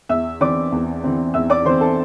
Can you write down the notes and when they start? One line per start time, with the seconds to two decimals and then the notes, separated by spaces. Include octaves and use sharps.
0.09 E2 E5 E6
0.41 E3 C4 D5 D6
0.72 E2
1.04 E3 C4
1.34 E2 E5 E6
1.50 D5 D6
1.65 E3 C4 C5 C6
1.81 A4 A5